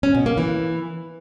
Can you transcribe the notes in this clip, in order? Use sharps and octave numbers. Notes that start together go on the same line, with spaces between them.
C#4
B2
A#3
E3